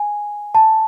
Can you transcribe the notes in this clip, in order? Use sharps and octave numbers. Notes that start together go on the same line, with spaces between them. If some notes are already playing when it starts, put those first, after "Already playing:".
Already playing: G#5
A5